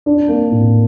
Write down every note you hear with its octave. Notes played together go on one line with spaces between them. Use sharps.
D4
A#3
A2